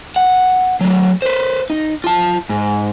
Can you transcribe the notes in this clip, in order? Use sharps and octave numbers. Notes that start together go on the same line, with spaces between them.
F#5
F#3 A3
B4 C5
D#4
F4 A5
G#2